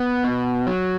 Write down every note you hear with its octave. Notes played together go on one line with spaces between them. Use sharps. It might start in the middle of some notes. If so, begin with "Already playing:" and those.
Already playing: B3
B2
F#3